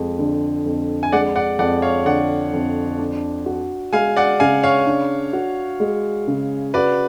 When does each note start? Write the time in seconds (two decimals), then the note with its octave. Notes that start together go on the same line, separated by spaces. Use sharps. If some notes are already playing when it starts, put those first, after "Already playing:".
Already playing: F2 G#3
0.19 D3
0.66 F2
1.03 G#5
1.12 G#3 D5 F#5
1.36 D5 F#5
1.59 F2 D5 F#5
1.82 C#5 F5
2.05 D3 D5 F#5
2.53 F2
2.99 D4
3.46 F#4
3.93 G#3 F5 G#5
4.16 D5 F#5
4.40 C#3 F5 G#5
4.63 C#5 F5
4.86 D4
5.33 F#4
5.80 G#3
6.28 C#3
6.74 F#4 B4 D5